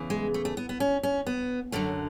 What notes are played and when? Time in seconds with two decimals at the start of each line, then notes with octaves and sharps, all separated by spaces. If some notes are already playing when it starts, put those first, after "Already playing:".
Already playing: E2 C#3 E3
0.10 G#3
0.34 A3
0.45 A3
0.57 B3
0.69 B3
0.80 C#4
1.03 C#4
1.27 B3
1.72 F#2 D3 F#3 A3